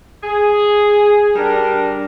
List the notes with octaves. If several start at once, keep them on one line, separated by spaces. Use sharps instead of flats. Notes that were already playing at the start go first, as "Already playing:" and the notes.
G#4
G3 D4 A#4